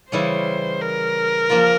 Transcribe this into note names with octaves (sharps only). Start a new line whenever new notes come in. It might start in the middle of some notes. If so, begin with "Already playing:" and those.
C#3 E3 G3 C#4 E4 C5
A#4
F3 A#3 F4